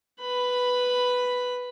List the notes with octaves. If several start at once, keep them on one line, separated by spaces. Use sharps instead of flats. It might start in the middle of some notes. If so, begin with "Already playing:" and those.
B4 B5